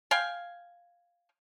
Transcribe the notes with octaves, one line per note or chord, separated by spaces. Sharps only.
F5 G5 G#5